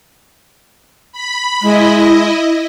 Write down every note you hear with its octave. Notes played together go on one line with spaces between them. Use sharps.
B5
G#3 E4 D#5